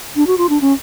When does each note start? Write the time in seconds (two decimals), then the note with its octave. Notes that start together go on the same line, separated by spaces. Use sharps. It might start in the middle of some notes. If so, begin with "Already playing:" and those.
0.16 D4
0.27 F#4
0.38 F4
0.49 D4
0.61 C#4